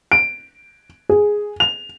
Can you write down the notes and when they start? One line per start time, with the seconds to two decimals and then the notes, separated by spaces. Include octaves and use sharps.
0.12 D7
1.09 G#4
1.60 F7